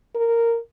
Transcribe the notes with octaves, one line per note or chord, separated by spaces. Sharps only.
A#4